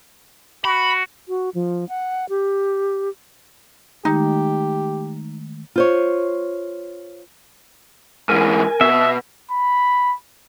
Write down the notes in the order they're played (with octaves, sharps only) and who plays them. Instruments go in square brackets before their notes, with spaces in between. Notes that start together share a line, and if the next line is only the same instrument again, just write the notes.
[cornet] F#4 [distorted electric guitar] B5
[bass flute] F#4
F3
F#5
G4
[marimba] D#3 G#3 A3 [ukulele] D#4 [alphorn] G4
[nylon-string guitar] F4 C5 C#5
[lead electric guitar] G#2 E3 [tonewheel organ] A#4 G#5
[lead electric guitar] B2 [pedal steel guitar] E5
[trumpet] B5